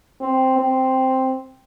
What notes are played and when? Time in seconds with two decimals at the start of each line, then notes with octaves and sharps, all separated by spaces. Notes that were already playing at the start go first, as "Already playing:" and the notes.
0.21 C4
0.59 C4